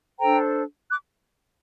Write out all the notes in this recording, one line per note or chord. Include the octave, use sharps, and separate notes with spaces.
D4 A4 C5 G5 A#5
D6 F#6